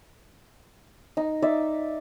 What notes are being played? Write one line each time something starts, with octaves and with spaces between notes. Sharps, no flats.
D#4
D#4 D5 E5